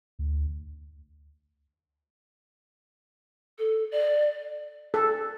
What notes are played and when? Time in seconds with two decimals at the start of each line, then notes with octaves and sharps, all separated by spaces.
0.19 D2
3.58 A4
3.92 D5
4.94 A4